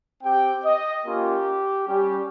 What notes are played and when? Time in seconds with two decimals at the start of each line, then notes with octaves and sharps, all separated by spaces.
0.23 C4 G4 G5
0.65 D#5
1.06 A#3 C#4 F4 G4
1.87 G3 C#4 G4